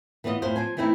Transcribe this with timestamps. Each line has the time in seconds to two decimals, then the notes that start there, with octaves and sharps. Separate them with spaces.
0.24 E3 B3 F4 D5 D#5
0.42 F2 A2 F4 C5
0.56 F3 C5 G#5
0.77 E3 A3 C4 D#4 E4